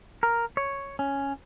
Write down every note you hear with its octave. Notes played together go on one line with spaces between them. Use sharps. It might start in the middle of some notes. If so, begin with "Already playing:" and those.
A#4
C#5
C#4